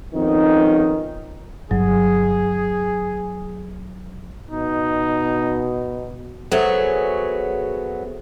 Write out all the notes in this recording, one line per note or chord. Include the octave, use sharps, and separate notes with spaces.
F2 D#3 B3 C#4 D#4
G1 F#3 G#4
B2 D#4
F#3 B3 G#4 A4 C5 C#5 E5